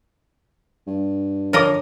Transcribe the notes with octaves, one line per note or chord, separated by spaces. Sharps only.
G2
D3 F3 A#4 C#5 D#5 D6